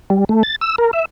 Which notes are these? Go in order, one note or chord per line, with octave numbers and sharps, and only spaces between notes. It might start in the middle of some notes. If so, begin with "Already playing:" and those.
G3
A3
A6
E6
A#4
E5